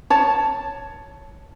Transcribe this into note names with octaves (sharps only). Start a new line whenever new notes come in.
C#5 A5